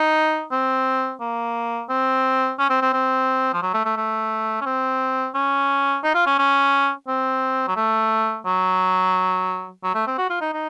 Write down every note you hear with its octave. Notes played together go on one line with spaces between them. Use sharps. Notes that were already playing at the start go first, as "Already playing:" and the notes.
Already playing: D#4
C4
A#3
C4
C#4
C4
C4
C4
F3
F#3
A3
A3
A3
C#4
C4
C#4
D#4
F4
C#4
C#4
C4
F#3
A3
F#3
F#3
A3
C4
F#4
F4
D#4
D#4